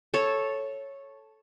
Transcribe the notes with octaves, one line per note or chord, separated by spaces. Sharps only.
A4 C#5